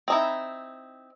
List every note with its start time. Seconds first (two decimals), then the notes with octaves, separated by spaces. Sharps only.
0.08 C4 D#4 E4